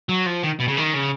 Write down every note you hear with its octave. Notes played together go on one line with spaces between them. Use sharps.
F#3
F3
D#3
B2
C#3
D#3
C#3